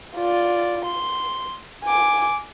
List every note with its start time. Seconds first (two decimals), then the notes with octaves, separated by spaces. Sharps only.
0.16 F4 D5
0.85 C6
1.85 G#5 D6